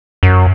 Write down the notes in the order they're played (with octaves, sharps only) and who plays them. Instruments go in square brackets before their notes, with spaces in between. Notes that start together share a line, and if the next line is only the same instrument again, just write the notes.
[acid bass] F#2